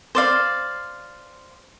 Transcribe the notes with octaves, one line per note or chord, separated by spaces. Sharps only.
C5 D5 F5